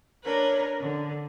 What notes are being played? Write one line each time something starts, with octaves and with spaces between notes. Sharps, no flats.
D4 A#4 B4 C#5
D3